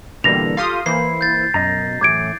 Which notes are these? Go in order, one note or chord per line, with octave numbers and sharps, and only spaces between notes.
B2 D3 E3 G3 A#3 A#6 F7
F4 G4 A4 F5 C6 D#6
E3 A#3 E4 C5 C7
G6 A6
F#2 B2 D#5 A#5
A2 E3 D6 G#6 D7